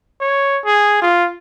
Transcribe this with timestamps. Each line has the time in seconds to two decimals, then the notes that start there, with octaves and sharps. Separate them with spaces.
0.21 C#5
0.65 G#4
1.02 F4